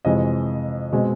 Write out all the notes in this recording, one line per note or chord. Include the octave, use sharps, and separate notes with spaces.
F2 C3 E3 G#3 D#5
B2 G#3 C4